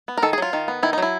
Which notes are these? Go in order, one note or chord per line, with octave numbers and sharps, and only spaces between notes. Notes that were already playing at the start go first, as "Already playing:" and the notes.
B3
A#4
D#3 A4
G#4
F#3 F4
D#3
B3
D#3 E4
D#4
F#3 E4